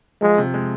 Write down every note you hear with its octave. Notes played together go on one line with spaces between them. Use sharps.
F3 G#3
C3
G#3